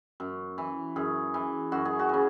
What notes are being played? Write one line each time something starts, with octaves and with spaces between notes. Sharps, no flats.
F#2
E3
F#2 G#4
E3
F#2 F#4
G#4
F#4
C#3 E3